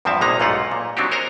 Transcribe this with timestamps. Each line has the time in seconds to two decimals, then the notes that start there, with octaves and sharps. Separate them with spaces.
0.05 E2 G2 F3 C4 E5 A5
0.21 A#1 C3 G#3 A#3 D#4 A#5
0.40 B1 G#2 A3 A#3 F4 F#5
0.71 A#2
0.97 F#3 C4 D4 D#4 F#4 G4
1.11 A#4 C5 C#5 D#5 A#5